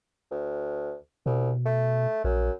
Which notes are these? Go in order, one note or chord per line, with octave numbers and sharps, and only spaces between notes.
D2
C2 B2
A3
A#1 F#2